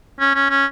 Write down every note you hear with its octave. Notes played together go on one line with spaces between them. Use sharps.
C#4
C#4
C#4